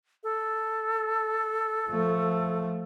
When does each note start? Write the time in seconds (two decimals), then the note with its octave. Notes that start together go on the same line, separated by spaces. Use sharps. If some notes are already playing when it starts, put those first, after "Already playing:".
0.24 A4
1.88 F3 A3